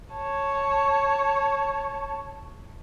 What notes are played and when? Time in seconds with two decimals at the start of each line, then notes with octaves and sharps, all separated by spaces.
0.13 C#5 A5